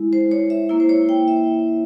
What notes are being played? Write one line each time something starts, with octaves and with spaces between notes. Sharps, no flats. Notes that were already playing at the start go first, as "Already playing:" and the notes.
Already playing: G#3 E4
C5
C#5
E5
A#3 E4
C5
C#5
G5
E5